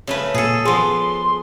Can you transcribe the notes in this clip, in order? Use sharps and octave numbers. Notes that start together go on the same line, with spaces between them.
C#3 A3 B4
A#2 G#4 A4
F3 B3 G#4 C6